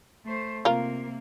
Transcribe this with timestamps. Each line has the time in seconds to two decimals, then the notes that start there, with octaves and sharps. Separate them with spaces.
0.25 A3 C5
0.65 C3 A#3 F4 A#4